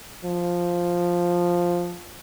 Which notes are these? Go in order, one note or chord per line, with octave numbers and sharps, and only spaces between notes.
F3